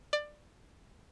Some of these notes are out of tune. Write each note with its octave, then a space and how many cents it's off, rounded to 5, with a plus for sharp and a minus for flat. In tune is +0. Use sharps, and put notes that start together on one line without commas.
D5 +20